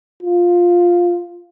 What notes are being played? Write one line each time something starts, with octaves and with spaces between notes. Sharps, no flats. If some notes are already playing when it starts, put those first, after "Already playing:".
F4